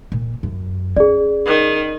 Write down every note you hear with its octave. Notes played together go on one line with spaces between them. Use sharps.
A#2
F#2
C#4 G#4 D5
D#3